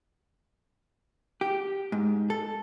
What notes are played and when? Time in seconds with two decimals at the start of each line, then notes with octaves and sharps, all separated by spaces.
1.41 G4
1.92 G#2
2.30 A4